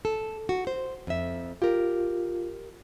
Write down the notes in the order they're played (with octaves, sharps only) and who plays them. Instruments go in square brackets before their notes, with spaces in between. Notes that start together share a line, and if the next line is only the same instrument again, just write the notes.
[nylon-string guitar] A4
F#4
C5
F2 E5
[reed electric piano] F4 [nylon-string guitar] G4 A#4